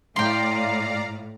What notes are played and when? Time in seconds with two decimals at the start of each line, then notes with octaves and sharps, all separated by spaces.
0.16 A2 D5 F5 G5 A#5 C6 C7